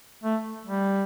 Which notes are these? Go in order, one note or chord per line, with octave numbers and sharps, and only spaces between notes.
A3
G3